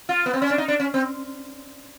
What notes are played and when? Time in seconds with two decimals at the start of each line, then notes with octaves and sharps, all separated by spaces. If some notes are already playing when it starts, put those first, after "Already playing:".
0.09 F4
0.26 B3
0.33 C4
0.42 C#4
0.50 D4
0.58 D#4
0.68 D4
0.80 C#4
0.94 C4